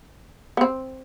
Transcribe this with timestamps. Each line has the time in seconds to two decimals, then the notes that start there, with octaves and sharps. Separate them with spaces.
0.57 B3
0.61 C4